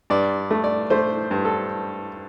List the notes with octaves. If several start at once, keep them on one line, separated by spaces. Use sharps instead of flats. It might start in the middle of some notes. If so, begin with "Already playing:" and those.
G2 D5
A3
D5
A3 C5
G2
A4